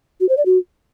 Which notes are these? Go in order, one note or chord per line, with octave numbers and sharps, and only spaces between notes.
F#4
C5
D5
F#4